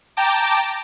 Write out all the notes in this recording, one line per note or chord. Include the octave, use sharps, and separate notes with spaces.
G5 A5 A#5 D6